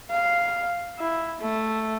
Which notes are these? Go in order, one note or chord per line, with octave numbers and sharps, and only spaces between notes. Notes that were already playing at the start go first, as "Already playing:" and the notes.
F5
E4
A3